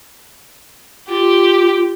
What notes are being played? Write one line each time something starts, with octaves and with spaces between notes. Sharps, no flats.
F4 G4